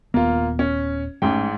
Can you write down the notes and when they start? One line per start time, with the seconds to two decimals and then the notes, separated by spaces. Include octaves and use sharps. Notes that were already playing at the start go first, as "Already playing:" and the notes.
0.14 D#1 A#3 B3 F4
0.59 C#4
1.22 A1 G#2 G#3 C#4 G5